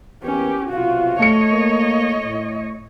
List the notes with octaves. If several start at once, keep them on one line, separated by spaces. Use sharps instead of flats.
E2 A#3 B3 C#4 G4
B1 C3 F4 F#4 F5
A3 C#5 D#5 C#7
A#3
A2